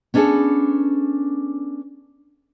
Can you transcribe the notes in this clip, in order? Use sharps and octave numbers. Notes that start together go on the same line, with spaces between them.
B3 C#4 D4 G#4 A4